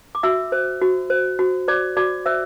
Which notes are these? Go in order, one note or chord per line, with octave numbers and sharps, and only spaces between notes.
D6
F#4 E5 E6
C5
F#4
C5
F#4
C5 D5 D6
F#4 D5 D6
C5 E5 E6